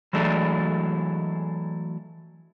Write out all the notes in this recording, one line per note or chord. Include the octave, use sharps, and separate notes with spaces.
E3 F#3 G#3 A3 D4